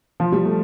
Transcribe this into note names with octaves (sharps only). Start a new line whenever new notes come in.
F3
G3
A3